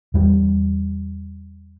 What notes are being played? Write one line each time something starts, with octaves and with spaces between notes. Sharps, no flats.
E2 G3